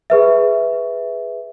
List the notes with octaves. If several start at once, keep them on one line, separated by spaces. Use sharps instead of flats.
G#4 B4 E5